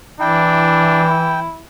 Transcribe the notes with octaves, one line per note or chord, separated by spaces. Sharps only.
E3 D4 E4 G5